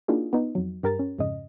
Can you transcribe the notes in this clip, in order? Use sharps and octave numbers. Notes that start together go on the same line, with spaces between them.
A#3 D4 D#4 F4 F#4 G#4
B3 D#4
F2 F#3
G2 G4 A#4 A#5 A6
C#4
F2 G#2 C#3 D#5